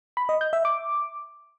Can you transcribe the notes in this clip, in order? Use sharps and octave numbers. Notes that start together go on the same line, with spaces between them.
B5
D#5
G6
E5
D6